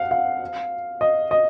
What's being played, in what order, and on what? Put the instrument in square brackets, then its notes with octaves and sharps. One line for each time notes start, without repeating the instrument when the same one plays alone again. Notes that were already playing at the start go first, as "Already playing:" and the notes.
Already playing: [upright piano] F5 F#5
F5
D#5
D#5